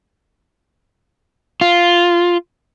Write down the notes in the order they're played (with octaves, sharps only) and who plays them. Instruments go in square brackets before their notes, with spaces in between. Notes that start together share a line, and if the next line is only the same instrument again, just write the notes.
[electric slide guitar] F4